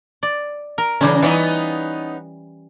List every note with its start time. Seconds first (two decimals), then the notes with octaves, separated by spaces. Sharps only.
0.23 D5
0.78 A#4
1.01 C#3 E3 G3 C#4
1.22 E3 B3 C#4 D#4